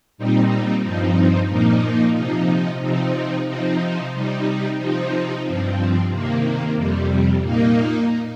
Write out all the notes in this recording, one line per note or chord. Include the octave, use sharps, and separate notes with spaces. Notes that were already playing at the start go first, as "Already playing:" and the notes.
A#2 G3 C4 D#4
G2 F3 C4 D#4
A#2 F3 A#3 D#4
C3 F3 D#4
C3 F3 C4 D#4
C3 F3 C4 D#4
C3 G3 D#4
C3 F3 C4 D#4
G2 F3 C4
C3 D#3 A#3
F2 C3 G3
A#2 A#3 D#4